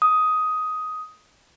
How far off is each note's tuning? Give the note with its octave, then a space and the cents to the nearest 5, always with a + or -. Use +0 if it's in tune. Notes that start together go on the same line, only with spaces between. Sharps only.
D#6 +10